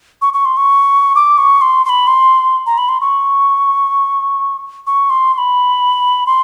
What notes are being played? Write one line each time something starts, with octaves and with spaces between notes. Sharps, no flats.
C#6
C#6
C6
C#6
D6
C#6
C6
C6
B5
C6
A#5
B5
C6
C#6
C#6
C6
C6
B5
C6